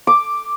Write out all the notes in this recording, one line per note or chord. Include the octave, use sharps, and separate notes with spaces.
D6